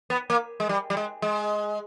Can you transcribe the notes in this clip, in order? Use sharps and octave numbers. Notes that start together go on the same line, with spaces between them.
B3
A#3
G#3
G3
G3
G#3
G#3